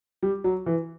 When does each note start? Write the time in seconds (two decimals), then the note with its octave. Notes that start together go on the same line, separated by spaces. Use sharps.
0.23 G3
0.44 F#3
0.66 E3